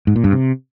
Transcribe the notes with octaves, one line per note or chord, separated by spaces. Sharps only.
G#2
A#2
G2
C3